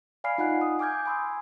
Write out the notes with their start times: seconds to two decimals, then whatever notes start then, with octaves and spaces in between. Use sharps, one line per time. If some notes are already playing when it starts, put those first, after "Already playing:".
0.24 D5 F5 G#5 B5 F6 C7
0.38 D#4 F4 F#5 G#5 F#6
0.61 D#6
0.79 G#5 D6 F6 G6 G#6
1.05 G#5 B5 C6 D#6 E6